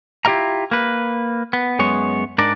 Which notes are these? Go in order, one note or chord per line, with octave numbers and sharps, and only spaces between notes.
E4 F4 G4 D#5 F5 A#5
A#3 B4
B3
F#2 G#3 B3 C#5
G#2 D4 A#4 D5